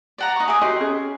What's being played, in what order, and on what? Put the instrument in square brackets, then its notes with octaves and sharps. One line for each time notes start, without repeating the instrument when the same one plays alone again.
[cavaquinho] D5 F#5 A#5
D#4 C#6
G#4 E5 D6
[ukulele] F#4 G4 D#5 [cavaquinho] C6
[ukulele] C#4 G#4